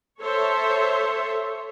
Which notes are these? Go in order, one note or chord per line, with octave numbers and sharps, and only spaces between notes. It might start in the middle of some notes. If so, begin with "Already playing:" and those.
A4 C5 C#5 E5